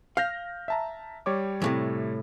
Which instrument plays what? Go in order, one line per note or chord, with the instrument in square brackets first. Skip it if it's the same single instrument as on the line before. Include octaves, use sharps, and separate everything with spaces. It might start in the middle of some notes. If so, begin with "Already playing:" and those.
[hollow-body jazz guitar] F5 [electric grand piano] F6 G6 A#6
[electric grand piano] E5 A5 A#5
G3 C#5 D6
[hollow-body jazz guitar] E2 A2 C3